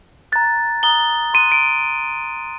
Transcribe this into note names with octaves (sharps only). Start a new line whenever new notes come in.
A#5 F#6 A6
A#5 D#6 F#6 G7
C6 D#6 F#6 D#7
D7